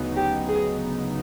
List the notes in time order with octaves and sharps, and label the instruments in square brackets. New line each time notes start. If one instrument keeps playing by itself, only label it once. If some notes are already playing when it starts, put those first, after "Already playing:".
Already playing: [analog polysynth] D2 C#3 F#3 B3 D#4
[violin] G4
G#4